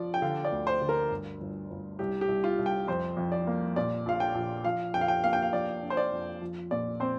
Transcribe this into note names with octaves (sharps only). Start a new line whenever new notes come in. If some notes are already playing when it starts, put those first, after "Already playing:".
Already playing: F3 D5
G5
D3 F5
D5
D2
C5
D3
A#4
G1
G1
G1
C2 G4
G4
C2
F4
C2
G5
F2 C5
F2
D5
A#3
A#2 D5
A#1 F5
G5
A#1
F3 F5
F2 G5
F5
G5
A#3 F5
G5
F5
F3 D5
D4
C5
D5
F2
F3
A#2 D5
C4 C5